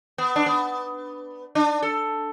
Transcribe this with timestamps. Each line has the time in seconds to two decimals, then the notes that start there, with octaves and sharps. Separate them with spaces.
0.18 B3
0.36 D4
0.46 B3
1.55 D4
1.82 A4